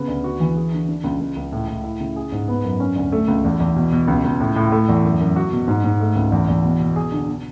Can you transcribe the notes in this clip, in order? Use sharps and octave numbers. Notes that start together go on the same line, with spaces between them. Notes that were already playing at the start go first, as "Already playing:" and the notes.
Already playing: C#3 B3
D2
F#4
E3
G#4
D3
D4
C#2
C#2
C#2
A2
A2
E4
C#3
G#4
G#2
B3
F#2
C#4
D2
A3
C#2
E2
E2
B2
B2
C#2
C#2
A2
A2
A3
E2
F#2
F#2
F#4
B2
G#2
G#2
A3
C#2
E2
E2
B2
B2
G#4
D3
B2